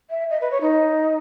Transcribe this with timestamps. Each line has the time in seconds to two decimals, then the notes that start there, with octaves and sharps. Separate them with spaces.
0.10 E5
0.30 D#5
0.41 B4
0.51 C#5
0.61 D#4